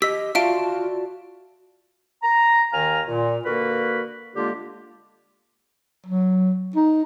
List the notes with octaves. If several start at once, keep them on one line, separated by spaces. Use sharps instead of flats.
G4 D#5 E6 B6
F4 F#4 D5 E5 F5 A5 D7
A#5
D#2 D#3 F5 G#5 A#5 F6
A#2
D3 A#3 F#4 A#4 B4 B5
D3 G#3 A#3 D4 F4 G4
F#3
D#4